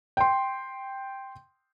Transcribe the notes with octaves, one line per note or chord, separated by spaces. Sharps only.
G5 C6